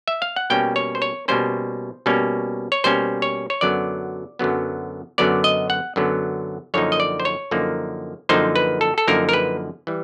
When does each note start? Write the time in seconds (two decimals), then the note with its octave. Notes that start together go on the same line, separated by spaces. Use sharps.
0.08 E5
0.22 F5
0.36 F#5
0.50 B2 G3 A#3 C#4 G5
0.76 C#5
0.95 C5
1.02 C#5
1.28 B2 G3 A#3 C#4 C5
2.06 B2 G3 A#3 C#4
2.72 C#5
2.84 B2 G3 A#3 C#4 C5
3.22 C#5
3.50 C#5
3.61 F#2 D3 F#3 B3 D5
4.39 F#2 D3 F#3 B3
5.18 F#2 D3 F#3 B3 D5
5.44 D#5
5.70 F#5
5.96 F#2 D3 F#3 B3
6.74 F#2 D3 F3 A#3 D#4 C#5
6.92 D#5
7.00 D5
7.20 C5
7.25 C#5
7.51 F#2 D3 F3 A#3 D#4
8.29 F#2 D3 F3 A#3 D#4 C5
8.56 B4
8.81 A4
8.98 A4
9.08 F#2 D3 F3 A#3 D#4 A#4
9.29 A#4
9.33 B4
9.87 E3 G3